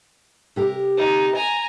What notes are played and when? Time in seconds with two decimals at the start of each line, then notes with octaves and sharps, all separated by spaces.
0.56 C3 G4 A#4
0.97 D#4
1.35 G#5 A#5